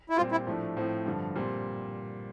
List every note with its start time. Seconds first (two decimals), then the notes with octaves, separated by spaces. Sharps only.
0.10 E4
0.16 A#2 G3 C4 F4 G4
0.31 E4
0.47 A2 F3 A3 D4
0.77 A2 F3 C4
1.06 G2 D3 F3
1.35 A#2 G3 C4